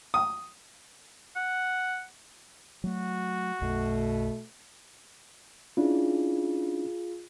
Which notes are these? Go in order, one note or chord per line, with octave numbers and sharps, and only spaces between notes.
D#6
F#5
F#3 A3 F#4
B1 F#2 B2 A3
C#4 D4 E4 F4 G#4